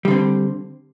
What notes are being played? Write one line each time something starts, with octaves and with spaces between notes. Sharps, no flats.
D3 G3 C4